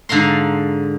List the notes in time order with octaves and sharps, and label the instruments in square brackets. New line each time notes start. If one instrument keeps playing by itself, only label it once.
[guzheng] G#2 D3 F5 A#5 C6